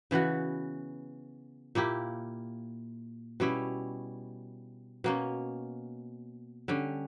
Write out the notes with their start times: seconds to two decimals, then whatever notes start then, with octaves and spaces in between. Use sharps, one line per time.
0.11 C#3 E3 B3 F#4
1.75 A#2 A#3 E4 G4
3.40 B2 G3 C#4 E4
5.04 B2 A#3 C#4
6.68 D3 G3 C#4